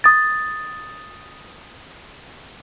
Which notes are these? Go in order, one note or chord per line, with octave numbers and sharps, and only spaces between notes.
D#6 A6